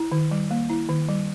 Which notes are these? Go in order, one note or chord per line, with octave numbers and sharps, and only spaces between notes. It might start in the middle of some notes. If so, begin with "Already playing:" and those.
Already playing: E4
D#3
G3
A#3
E4
D#3
G3